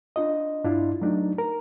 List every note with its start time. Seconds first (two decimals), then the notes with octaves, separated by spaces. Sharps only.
0.16 D4 F4 D#5
0.64 G2 D4 E4 F4
1.01 F#3 A3 D4 D#4
1.38 A#4